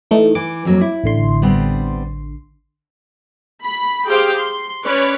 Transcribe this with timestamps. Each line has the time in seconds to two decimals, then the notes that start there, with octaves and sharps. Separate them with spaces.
0.11 E3 A3 D#4
0.35 E3 D6
0.65 F2 F#3 A#3
0.81 E4
1.04 A1 D3 C6
1.42 G3 B3 C4
3.64 B5
4.07 G4 G#4 C5 F5 G5
4.37 C6
4.83 C#4 B4 C#5 D5